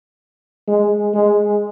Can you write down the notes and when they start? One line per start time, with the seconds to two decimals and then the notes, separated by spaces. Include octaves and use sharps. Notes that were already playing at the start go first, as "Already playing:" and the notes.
0.68 G#3
1.15 G#3